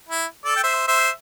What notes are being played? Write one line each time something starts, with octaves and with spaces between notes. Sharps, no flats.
E4
A4 D5
G5
C5 E5
C5 E5